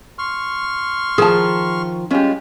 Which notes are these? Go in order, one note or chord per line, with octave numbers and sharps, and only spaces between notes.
C6 C#6 F6
D#3 F3 G#4 A5
G3 G#3 C#4 F4 G4